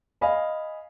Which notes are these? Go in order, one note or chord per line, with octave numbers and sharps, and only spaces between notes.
D#5 F5 G#5 B5